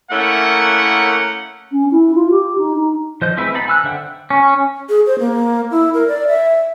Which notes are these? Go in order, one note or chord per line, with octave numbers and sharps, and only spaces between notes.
A3 A#3 C#4 E4 A#4 F#5
C#4
E4
F4
G4
D#4
D#4
F3 C5 D#5 G6
G#3 C4 E4 B4 E5
B3 D#4 A5 B5
G#5 E6 F#6
D3 C5 E5 F#5 G5
C#4
G#4
C5
A#3
E4
A#4
D5
E5